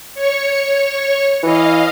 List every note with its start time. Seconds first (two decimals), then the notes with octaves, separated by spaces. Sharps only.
0.15 C#5 C#6
1.43 E3 D#5 F5